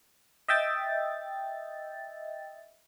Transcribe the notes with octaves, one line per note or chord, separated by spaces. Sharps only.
D#5 E5 G5 A6